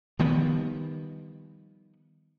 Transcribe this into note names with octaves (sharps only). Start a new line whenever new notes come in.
D#3 F3 G3 B3